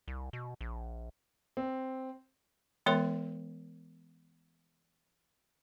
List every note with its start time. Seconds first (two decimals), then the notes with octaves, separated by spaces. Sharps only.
0.08 C2
0.33 B2
0.61 A#1
1.57 C4
2.86 E3 G#3 B3 A#4 C#5 C6